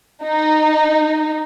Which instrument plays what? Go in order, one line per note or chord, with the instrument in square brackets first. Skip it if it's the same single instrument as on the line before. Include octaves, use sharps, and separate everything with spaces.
[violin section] D#4